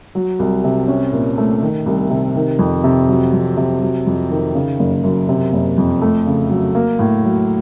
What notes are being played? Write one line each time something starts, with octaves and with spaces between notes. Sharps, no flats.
F#3
C2
C3
C#4
A#2
A3
D#3
C2
C3
D#3
F2
C3
F#3
F2
C3
F#3
F2
D#3
C#3
F#1
F#2
C3
F#1
F2
A3
C#3
F#3
A#3
A2
F#3